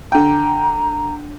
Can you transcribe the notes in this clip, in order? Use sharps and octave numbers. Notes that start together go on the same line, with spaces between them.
D3 G5 A#5